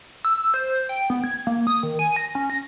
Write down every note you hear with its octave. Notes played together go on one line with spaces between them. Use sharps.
E6
C5
G5
B3
G#6
A#3
D#6
D#3
G#5
A#6
C#4
A#6